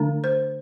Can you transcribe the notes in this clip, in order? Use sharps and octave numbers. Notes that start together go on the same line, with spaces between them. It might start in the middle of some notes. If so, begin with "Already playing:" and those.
Already playing: D3 A3 D4
C5